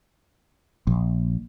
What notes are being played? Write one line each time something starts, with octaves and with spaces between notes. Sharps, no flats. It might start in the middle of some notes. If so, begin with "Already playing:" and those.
A#1